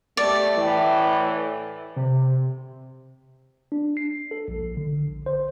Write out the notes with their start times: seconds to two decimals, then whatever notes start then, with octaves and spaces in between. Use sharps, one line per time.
0.17 G3 A3 D5
0.56 A2 E3
1.96 C3
3.72 D4
3.97 C7
4.31 A4
4.48 A#1
4.77 D3
5.07 A#1
5.26 C5